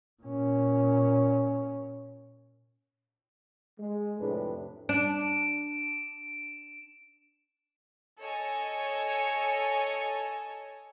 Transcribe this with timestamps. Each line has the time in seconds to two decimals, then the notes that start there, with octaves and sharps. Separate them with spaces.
0.22 A#2 C#4
3.79 G#3
4.20 F2 A2 C3 D4 B4
4.89 D4 D7 E7
8.20 A4 C#5 D#5 G#5